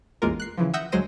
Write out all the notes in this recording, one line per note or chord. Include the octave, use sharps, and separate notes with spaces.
A1 E2 G#3 A#3 F4 A#4
F#6 C7
C#3 E3 F3
E5 F#5 D#6 E6 G6 A#6
D2 F#3 G#3 C5 A#6 D#7